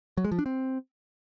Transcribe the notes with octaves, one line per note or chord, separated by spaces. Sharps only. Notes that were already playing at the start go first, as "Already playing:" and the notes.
F#3
G#3
F3
D4
C4